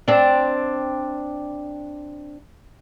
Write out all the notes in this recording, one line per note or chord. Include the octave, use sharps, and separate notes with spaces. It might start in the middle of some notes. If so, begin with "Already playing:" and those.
C4 D4